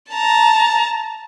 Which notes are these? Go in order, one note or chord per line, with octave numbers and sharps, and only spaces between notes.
A5 A#5